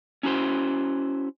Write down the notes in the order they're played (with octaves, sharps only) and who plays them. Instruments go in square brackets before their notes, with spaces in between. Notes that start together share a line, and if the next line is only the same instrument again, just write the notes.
[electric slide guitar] C#4 E4 F#4 B4 C5